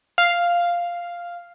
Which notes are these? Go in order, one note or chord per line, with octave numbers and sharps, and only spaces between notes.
F5